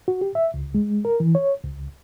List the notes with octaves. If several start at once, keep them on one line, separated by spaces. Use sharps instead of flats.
F#4
G4
E5
C#2
G#3
A#4
E3
C#5
C#2